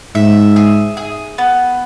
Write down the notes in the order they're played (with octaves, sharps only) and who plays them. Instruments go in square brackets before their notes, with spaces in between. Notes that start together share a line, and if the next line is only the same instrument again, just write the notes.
[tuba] G#2 [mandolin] E5
[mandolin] G#4
G#4
B3